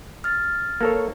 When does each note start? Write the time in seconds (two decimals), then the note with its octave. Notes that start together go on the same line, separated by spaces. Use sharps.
0.24 F6 A6
0.81 A#3 A4 C#5